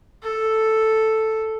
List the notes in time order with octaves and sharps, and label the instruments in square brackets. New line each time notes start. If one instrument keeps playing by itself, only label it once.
[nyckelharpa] A4